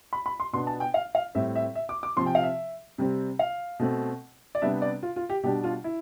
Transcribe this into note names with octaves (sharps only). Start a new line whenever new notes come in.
B5
B5
C6
B2 B3 D4 C6
A5
G5
F5
F5
A2 G3 C4 E5
E5
E5
D6
D6
C3 F3 C4 C6
G5
F5
E5
C3 G3 C4
F5
B2 A3 C4
D5
C3 G3 B3 D4 E5
D5
F4
F4
G4
B2 G3 D4 G4
F4
E4